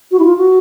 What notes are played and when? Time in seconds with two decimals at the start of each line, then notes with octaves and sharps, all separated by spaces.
0.11 F#4
0.19 E4
0.24 F4
0.37 F#4